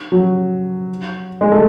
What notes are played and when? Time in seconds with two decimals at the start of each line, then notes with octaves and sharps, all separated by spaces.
0.12 F#3
1.41 G#3
1.52 A3